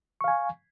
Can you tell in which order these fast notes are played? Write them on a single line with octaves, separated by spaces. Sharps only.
C#6 F5 G#5